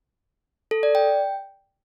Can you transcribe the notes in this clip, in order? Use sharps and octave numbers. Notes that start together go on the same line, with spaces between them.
A4
D5
G5